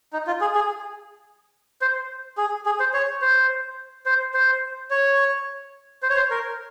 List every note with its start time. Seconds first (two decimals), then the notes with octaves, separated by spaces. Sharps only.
0.13 D#4
0.27 F4
0.41 G#4
0.55 G#4
1.81 C5
2.38 G#4
2.66 G#4
2.80 C5
2.94 C#5
3.21 C5
4.06 C5
4.34 C5
4.91 C#5
6.03 C5
6.10 C#5
6.17 C5
6.31 A#4